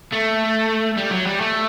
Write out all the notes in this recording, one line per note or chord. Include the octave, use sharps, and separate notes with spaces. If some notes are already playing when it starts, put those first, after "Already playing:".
A3
G3
F#3
G3
A3